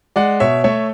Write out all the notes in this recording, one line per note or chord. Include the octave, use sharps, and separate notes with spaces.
G#3 D5 F#5
B2 C#5 E5
A3 C#5 E5